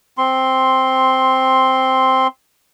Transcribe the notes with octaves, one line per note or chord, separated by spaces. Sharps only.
C4 C6